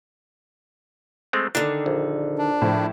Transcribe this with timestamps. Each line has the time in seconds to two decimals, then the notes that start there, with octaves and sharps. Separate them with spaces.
1.33 G#3 A3 C4
1.55 D3 D#3 D4
1.86 A#1
2.38 D4
2.62 A2 F3